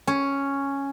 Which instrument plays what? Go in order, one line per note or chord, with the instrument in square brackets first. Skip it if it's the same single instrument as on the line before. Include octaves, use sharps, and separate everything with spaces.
[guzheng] C#4